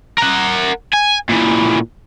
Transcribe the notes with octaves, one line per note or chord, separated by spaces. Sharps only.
A#4 F#5
G#5
A#2 E3